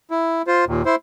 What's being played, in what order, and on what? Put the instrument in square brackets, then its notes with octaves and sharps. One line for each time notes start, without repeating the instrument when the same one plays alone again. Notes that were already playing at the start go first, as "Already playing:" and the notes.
[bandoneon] E4
F4 C5
D#2 A#2
E4 C5